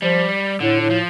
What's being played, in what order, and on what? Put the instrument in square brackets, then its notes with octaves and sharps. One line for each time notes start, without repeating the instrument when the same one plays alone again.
[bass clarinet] F3 [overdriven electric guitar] G3
[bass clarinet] A2 [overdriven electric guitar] D3
[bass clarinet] A2
[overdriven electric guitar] F3